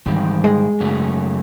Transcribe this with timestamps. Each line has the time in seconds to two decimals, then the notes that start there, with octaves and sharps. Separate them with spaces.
0.06 G#2 D#3 E3 G3
0.44 G#3
0.80 F#2 C#3 F#3 A3